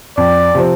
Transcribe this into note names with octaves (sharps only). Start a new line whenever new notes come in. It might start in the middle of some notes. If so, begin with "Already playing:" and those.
F2 D5
C3 F3 C4